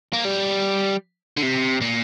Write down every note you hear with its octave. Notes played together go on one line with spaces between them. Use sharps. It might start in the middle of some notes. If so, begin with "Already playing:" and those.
A#3
G3
D3
C3
A#2